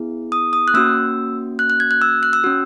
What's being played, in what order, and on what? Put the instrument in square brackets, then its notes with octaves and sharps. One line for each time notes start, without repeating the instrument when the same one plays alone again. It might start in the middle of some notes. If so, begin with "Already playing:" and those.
Already playing: [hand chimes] B3 E4 G#4
D#6
D#6
F#6
A#3 C#4 F#4 E6
F#6
F#6
G#6
F#6
E6
F#6
E6
C#4 F#4